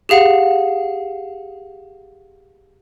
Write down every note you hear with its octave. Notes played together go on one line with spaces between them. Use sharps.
G4 G#4 F5 F#5